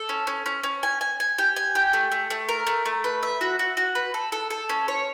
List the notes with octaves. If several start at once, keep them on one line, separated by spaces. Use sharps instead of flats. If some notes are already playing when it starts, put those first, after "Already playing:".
Already playing: A4
C#4
C#4
C#4
C#4
G#5
G#5
G#5
G4
G#5
G4
A3
A3
A3
A#4
A3
A3
B4
E5
F#4
F#4
F#4
B4
A4
A4
A4
C#4
C#5